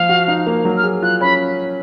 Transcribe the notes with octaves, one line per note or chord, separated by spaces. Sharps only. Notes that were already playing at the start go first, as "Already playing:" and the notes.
Already playing: F3 F5
F#4
D#4
A#3
F#3
F6
G#4
F4 F#6
C#4 B5